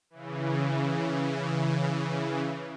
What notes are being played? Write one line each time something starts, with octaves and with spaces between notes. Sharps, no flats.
C#3 E3